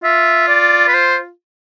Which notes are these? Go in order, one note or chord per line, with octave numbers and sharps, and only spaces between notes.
F4 E5
D5
B4
C5